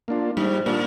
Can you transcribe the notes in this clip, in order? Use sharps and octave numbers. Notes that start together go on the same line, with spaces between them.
A#3 D4 F4
G#2 G3
A#2 A#3 D4 F4